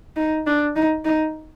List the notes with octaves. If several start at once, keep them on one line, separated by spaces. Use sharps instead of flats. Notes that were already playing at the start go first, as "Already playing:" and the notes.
D#4
D4
D#4
D#4